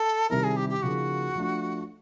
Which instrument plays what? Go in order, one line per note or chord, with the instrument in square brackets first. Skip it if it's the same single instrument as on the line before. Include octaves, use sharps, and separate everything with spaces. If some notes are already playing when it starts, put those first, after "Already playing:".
Already playing: [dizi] A4
[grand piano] C3 D#3 G3 C4 E4 [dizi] A#4
[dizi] G#4
G4
G4
[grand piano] C#3 F3 A#3 D#4 [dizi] F#4
[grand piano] F3 A3 D4